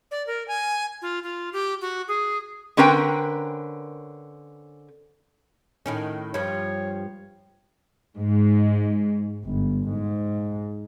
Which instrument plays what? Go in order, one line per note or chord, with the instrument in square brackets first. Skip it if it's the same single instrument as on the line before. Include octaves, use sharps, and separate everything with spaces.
[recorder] D5
A#4
G#5
F4
F4
G4
F#4
G#4
[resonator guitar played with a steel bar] D3 C4 C#4 A#4 B4 G5
[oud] A2 D#3 C#4
[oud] G2 F3 [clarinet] C#5
[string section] G#2
G1
G#2